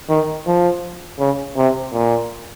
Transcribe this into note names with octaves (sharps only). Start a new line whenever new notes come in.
D#3
F3
C#3
C3
A#2